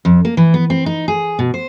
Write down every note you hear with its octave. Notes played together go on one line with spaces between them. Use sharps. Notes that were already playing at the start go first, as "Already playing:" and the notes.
F2
A#3
E3
B3
C4
D#4
G#4
B2
C5